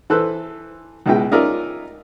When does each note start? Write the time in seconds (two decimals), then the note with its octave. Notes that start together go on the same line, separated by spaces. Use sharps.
0.10 E3 A4 B4 C5 E6 F#6
1.06 C#2 B2 G#3 E4 G5
1.31 C#4 D#4 F4 A#4 D5 E5